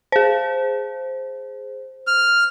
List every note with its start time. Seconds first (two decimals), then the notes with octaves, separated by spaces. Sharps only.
0.12 G#4 C5
2.07 F6